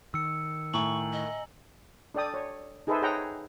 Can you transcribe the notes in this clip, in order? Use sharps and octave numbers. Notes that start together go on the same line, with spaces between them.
D#3 E6 C#7
A2 G#5 A#5 C#6 F#7
D#5
D4 A4 D5 G5 D#6
C#5
D#4 G#4 A4 B4 C5 E5
G#4 C#5 F#5 G5 A#5